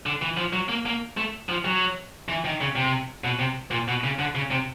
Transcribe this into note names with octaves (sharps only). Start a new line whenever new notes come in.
D3
E3
F3
F#3
A#3
A#3
A3
F3
F#3
E3
D#3
C#3
C3
B2
C3
A#2
B2
C#3
D3
C#3
C3